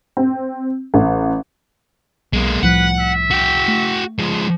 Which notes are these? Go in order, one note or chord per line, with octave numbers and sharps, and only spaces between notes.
C4
A1
B1 G#3 A#3
C2 A2 F3 B4 F#5
E5
F#4 G5
A3
F3 G#3